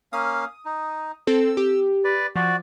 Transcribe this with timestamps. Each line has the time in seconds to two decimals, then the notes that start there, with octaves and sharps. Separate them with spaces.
0.13 A#3 C#4 F5 D#6
0.65 D#4
1.27 C4 A4 E6
1.57 G4
2.04 B4 D5
2.36 F3 F#4 D5